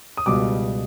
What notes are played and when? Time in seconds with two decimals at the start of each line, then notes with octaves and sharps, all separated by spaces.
0.17 D#6
0.26 C#2 B2 G3 D6